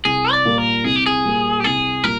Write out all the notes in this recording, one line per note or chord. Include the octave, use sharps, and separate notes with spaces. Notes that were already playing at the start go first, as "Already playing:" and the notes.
C2 G#4
D5
A#2 G3 A#3 F4
A#4
C2 G#4
G4
G#4
A#2 G3 A#3 F4
G4
C2 G#4
A#2 G3 A#3 F4 A#4